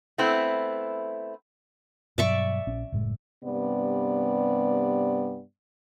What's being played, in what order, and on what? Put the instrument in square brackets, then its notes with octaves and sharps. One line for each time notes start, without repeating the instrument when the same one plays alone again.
[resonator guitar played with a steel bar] A3 B3 C4 E4
[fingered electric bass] G2 B2 F#3 [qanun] D5 E5 C#6
[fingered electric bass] A#1 C#4
F#1 A2 G#3
[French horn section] G2 C3 B3 D5